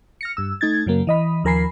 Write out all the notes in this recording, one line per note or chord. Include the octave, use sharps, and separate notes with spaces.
F6 A#6 C#7
G2 E6
A3 D#4 G#6 A6
F#2 C#3 F#3 A#3
E3 D#5 B5
D#2 F3 A#4 G#5 B5 C7